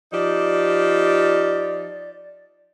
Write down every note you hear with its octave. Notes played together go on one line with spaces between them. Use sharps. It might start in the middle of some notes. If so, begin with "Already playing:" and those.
F3 D#4 G4 D5